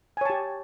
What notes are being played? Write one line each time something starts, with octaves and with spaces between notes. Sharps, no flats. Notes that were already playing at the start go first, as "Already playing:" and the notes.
G4 C#5 G#5 A5